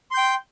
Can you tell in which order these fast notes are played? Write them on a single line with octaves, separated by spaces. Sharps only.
C6 G6 G5